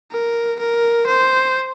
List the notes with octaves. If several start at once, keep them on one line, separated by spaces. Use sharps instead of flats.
A#4
A#4
C5